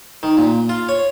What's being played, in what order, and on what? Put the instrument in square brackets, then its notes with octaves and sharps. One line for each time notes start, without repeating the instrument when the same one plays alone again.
[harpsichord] D#3
A#2
F4
C#5